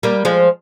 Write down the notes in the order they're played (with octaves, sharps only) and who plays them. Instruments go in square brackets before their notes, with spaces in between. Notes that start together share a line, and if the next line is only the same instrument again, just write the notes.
[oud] G3 A#3
F3 G#3